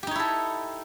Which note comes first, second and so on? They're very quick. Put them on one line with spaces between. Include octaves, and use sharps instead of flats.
G4 D#4 C#5 E4 A4